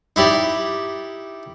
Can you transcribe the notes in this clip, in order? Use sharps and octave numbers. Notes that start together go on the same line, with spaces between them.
D#4 E4 G4 D5